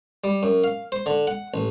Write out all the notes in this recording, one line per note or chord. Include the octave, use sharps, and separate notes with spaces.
G3
F#2
F5
C5
D3
F#5
A1